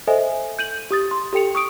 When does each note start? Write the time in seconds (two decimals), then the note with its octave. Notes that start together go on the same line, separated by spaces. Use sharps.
0.07 A4 C5 D#5 E5 G#5
0.59 G6 D#7 F#7
0.91 G4 D#6 A6
1.11 C6
1.33 G4 A4 G5 C#7 F7
1.55 C#6 D#6 D7